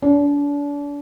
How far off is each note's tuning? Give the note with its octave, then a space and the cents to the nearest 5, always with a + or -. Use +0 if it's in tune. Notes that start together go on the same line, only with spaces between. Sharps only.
D4 -35